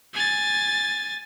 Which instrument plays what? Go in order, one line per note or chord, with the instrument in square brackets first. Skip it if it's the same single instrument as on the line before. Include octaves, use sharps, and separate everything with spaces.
[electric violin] G#5 A6